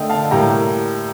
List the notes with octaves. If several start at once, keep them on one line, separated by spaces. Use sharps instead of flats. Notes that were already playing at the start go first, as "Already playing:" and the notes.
Already playing: D3 A3 D#5 G5
F5 A5
A2 G3 A#3 G5 A#5